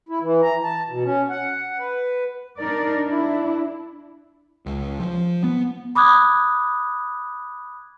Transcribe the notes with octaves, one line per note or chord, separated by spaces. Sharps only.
E4
E3
A#5
A5
B2
C#4
F#5
B4
D4 D#4 A#4 D5
D4 E4
C#2
F3
B3
B5 D6 D#6 F#6 G#6